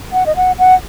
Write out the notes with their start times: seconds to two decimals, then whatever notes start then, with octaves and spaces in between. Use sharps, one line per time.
0.13 F#5
0.26 D#5
0.36 F#5
0.59 F#5